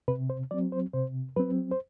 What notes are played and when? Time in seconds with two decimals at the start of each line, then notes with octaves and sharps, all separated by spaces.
0.08 C3 B4
0.30 C5
0.51 F#3 C4 D5
0.72 C5
0.93 C3 C5
1.36 F#3 C4 B4
1.71 C5